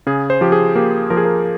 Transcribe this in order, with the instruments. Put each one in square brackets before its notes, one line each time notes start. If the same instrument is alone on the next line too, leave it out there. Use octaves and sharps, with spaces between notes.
[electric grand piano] C#3 G#4
C5
F3 G4
G#4
A#3 G4
F3 A#4
G#4
A#4